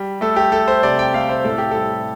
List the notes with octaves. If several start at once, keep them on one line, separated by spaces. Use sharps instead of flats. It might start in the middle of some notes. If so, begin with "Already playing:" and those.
Already playing: G3
A3 A4
G4
A3 A4
C5
C3 D5
G5
A3 F5
C5
A2 A4
G4
G3 A4